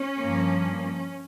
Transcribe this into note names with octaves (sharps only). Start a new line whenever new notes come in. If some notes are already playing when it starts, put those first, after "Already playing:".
Already playing: C#4
G2 F3 A#3